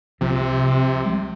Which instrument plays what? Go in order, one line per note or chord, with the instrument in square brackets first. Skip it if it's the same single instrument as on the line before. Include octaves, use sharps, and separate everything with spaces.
[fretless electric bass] C2 F3 C4 [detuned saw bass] C3
[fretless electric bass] F3 G3 G#3